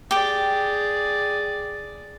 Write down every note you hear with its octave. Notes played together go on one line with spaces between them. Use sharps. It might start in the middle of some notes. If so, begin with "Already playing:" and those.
G4 G#4 D5 G5